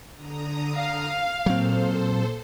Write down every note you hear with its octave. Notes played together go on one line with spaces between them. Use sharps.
D3 A#5 D#6
F5
A#2 F#3 C4 A4 C5